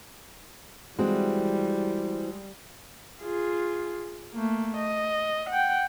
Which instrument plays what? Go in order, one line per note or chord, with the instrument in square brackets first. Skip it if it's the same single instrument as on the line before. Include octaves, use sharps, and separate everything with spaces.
[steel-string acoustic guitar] E3 C4 F#4 [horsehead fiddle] G3 [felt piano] G#3
[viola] F4 G#4
A3 A#3
D#5
F#5 G5